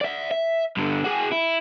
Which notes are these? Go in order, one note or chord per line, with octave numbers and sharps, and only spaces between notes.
D5 E5
E5
G2 D3
F#4 G#4
E4